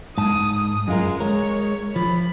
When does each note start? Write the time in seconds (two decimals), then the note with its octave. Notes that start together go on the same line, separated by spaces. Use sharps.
0.18 G#2 A5 D#6
0.88 F#2 G#3 F4 A#4
1.20 G#3 A#4 C#5
1.96 F3 B5